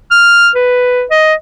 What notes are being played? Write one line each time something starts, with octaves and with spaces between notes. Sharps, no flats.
F6
B4
D#5